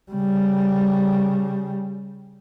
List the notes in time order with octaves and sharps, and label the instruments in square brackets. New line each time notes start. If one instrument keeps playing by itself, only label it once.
[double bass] C#3 G3